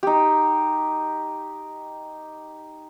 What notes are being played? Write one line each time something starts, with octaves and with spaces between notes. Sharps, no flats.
D#4 G4